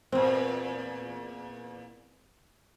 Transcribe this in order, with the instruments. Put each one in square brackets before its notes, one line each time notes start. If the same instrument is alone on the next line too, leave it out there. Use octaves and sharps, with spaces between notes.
[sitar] E2 A#2 [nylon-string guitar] C4 [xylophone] C5